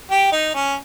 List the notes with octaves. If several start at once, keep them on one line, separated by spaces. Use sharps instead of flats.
G4
D#4
C#4